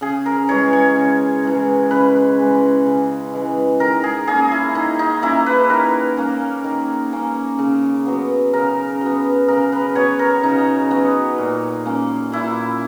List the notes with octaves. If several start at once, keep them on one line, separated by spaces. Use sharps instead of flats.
C#3 G#4
A#4
E3 G#3 C#5
C#5
C#3
E3 G#3
C#3 B4
E3 G#3
C#3
E3 G#3
D#3 A#4
G#4
A#3 C#4 G#4
E4
D#3 D#4
D#4
A#3 C#4 E4
B4
D#3 A#4
A#3 C#4
D#3
A#3 C#4
C#3
F#3 B3
C#3 A#4
F#3 B3
C#3 A#4
B4
F#3 B3 C#5
A#4
C#3 D#4
F#3 B3
A#2
A#3 C#4
A#2 E4